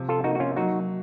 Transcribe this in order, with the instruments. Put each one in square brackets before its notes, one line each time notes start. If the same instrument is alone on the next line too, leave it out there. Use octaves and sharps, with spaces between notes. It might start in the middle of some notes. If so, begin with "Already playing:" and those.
Already playing: [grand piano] C3 F3
[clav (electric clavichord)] F4 A4
[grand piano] A#3 [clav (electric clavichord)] D#4 F#4
[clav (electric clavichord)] F#4
C#4 F4
[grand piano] F#3 [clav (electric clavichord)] D#4 F#4